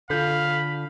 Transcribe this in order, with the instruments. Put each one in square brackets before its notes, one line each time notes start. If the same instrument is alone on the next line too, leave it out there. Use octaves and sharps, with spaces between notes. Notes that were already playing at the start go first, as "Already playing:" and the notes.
[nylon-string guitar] D3 F4 [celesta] A4 G6 [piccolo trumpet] F5 [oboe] B5